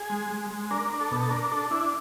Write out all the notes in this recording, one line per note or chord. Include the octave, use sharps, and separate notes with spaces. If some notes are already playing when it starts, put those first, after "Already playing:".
Already playing: G#4
G#3
G#3
G#3
D4 A#4
D4
A4
B2
A4
D4 A#4
D4 A4
D4 E4